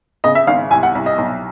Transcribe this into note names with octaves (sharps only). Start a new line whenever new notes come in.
C#3 D#5
E5
G#1 F5
C2 G#5
F#5
C2
D#5
B1